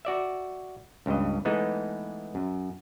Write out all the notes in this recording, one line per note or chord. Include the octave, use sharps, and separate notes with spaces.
F#4 D5 E5
C#2 G2 D#5
E3 G#3 A3 B3 D#4
F#2